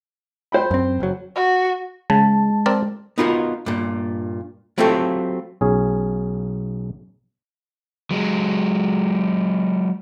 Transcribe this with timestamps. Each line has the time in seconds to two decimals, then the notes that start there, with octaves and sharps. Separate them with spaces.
0.52 C5 G5 B5
0.71 F#2 C4
1.00 F#1 F#3
1.35 F#4
2.10 C#3 G#3 A5
2.66 C4 A#4 D5
3.18 B3 D#4 F4 F#4 A4 A#4
3.66 G2 A#2
4.78 F#3 A3 C4 F4 G4 A4
5.61 B1 C#4 G#4
8.11 F#3 G#3